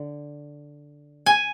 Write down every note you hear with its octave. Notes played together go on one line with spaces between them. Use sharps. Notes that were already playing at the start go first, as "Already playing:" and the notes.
Already playing: D3
G#5